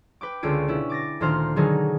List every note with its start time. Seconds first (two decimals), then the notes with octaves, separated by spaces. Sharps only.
0.21 B4 G5 D6
0.42 C#2 D3 C#4 F4 D7
0.68 B2 C#4 E4
0.90 D6 A6 A#6
1.20 D2 A#2 D#3 C5 F6
1.56 B2 D3 D#3 F#3 D#4 G#4